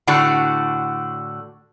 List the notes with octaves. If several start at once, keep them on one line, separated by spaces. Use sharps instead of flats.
A2 D3 D4 F#4